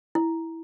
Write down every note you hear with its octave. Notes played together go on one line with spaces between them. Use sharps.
E4